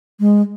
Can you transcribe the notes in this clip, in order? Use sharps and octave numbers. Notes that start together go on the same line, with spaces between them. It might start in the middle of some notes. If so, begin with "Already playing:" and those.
G#3